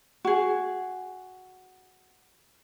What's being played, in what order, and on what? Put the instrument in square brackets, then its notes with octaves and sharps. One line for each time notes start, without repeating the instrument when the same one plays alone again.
[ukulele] F#4 G#4